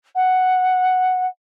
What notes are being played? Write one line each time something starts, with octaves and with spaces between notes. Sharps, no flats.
F#5